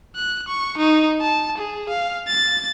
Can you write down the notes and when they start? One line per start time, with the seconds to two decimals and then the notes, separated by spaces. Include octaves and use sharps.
0.16 F#6
0.48 C#6
0.78 D#4
1.21 A5
1.57 G#4
1.89 F5
2.28 A6